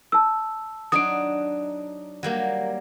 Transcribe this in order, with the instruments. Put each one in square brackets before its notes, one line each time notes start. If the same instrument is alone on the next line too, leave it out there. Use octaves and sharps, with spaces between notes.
[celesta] A5 E6
[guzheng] F#3 D4 D#4 [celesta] D#6 D7
[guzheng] F#3 G3 A#3